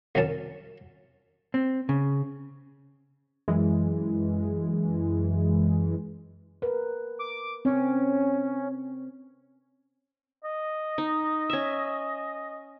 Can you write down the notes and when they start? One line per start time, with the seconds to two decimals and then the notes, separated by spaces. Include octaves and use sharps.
0.15 C2 D#3 F#3 C#4 A5
1.54 C4
1.89 C#3
3.48 F#2 E3 G#3
6.62 A#4 B4
7.19 D6
7.65 C4 C#4
10.44 D#5
10.98 D#4
11.50 C#4 E5